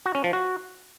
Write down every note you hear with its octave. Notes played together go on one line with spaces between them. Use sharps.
F#4
C#4
F3
F#4